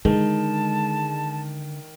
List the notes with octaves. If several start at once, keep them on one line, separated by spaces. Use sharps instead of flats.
D3 D#3 G#3 A5